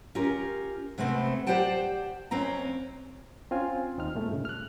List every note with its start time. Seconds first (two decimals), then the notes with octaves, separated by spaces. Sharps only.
0.15 C#4 F4 G4 A#4
0.98 C3 G#3 A3 B3 C4
1.47 G4 C5 D5 F#5 G5 A5
2.31 F2 C4 C#4 A#5
3.51 C4 C#4 F4 G#5
3.98 D#2 C4 D#4 F6
4.15 A#2 G#3 A3
4.29 G2 C#3
4.45 F6 F#6